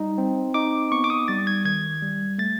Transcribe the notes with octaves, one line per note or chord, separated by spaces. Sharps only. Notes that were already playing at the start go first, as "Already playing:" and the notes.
Already playing: G3 D#4
C4
D#4 D6
B3 C#6
D6
D#6
G3 A6
G#6
D#3 G#6
G3
A3 A6